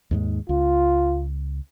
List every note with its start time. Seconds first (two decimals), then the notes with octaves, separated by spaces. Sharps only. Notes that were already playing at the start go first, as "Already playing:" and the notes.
0.11 D#2 G#2 G#3
0.49 C#2 F4